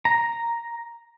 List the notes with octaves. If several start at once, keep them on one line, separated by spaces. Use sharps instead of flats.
A#5